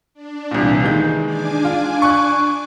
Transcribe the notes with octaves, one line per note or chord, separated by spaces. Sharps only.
D4
C2 A#2 E3
D#3 G#3 G6
D4 G#5 D6
F4
C#6 F#6